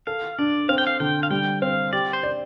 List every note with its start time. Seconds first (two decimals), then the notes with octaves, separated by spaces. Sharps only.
0.07 A4 F5
0.39 D4 D5
0.69 C4 F5
0.78 G5
0.87 F5
1.00 D3 G5
1.23 F5
1.31 G3 G5
1.62 C4 F5
1.93 G4 D5
2.13 C5
2.23 D5